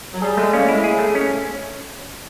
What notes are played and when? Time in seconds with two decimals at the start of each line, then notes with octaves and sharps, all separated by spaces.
0.14 F#3
0.21 G3 G#4
0.37 G#3 A3
0.53 A#3 C#4
0.68 G#3 E4
0.84 G#4
0.99 A3
1.15 C#4